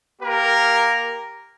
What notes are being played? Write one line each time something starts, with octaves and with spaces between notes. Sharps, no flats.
A#3 G4 A#4